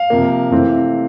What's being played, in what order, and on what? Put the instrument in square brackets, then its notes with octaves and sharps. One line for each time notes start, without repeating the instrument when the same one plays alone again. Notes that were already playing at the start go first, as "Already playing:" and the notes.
Already playing: [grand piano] F5
C3 F3 A#3
C3 E3 A3 C4